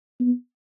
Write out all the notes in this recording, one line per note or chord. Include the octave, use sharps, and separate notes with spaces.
B3